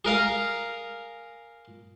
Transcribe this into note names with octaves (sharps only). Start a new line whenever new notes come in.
G#4 A#4 F5 A#5